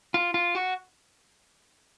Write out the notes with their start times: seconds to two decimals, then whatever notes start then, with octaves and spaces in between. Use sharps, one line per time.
0.14 F4
0.34 F4
0.55 F#4